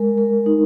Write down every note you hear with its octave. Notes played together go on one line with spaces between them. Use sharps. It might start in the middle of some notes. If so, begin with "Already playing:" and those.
Already playing: G#3 A#4
A#4
D#4